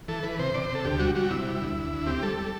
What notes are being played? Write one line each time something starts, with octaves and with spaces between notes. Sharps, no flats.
E3 A4
E3 B4
C3 C5
C3 D5
C5
C3
A4
D2 G4
G3 F#4
G3 F#4
C3 E4
G3
D2
D2
D2
C4 G4
G3 A4
G3